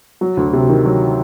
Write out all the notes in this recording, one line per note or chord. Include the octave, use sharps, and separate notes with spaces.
F#3
D2
C3
D#3
F#3